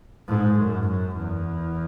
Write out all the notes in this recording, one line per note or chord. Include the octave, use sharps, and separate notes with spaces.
G#2
F#2
F#2
E2